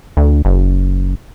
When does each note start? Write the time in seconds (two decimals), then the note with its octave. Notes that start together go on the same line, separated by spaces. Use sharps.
0.17 D2
0.45 F#1